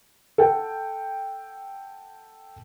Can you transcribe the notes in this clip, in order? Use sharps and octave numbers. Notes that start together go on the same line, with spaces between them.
A4 F#5 G5